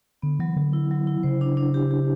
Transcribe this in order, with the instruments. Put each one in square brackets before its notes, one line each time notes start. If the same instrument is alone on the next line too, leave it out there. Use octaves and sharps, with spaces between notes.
[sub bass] D3 [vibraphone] B3
[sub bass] E3 [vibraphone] F#3
[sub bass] D3 [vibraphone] F#3
[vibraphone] E4
F#3
E4
[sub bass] C#3 [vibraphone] C5
[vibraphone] D4
D4
G4
G4